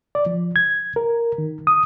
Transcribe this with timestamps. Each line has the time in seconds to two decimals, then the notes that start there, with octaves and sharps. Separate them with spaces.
0.15 D5
0.26 F3
0.56 G#6
0.96 A#4
1.38 D#3
1.67 D#6